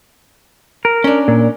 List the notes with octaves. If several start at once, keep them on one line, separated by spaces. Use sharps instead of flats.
A#4
C#4 D4
A#2